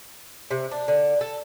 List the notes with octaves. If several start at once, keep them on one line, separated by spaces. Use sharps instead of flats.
C3
D4
D3
A4